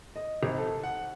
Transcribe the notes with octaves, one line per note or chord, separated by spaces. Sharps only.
D#5
G#1
A4
F#5